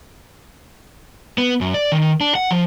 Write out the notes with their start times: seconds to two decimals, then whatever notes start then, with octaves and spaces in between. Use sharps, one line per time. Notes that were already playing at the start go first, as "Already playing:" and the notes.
1.38 B3
1.61 F#2
1.74 D5
1.92 D#3
2.21 D4
2.35 F#5
2.51 F3